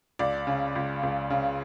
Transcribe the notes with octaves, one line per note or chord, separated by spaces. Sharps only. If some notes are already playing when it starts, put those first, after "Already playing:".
C#2 D5
C#3
C#2
C#2
C#3